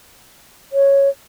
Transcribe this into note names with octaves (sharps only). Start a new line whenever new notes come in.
C#5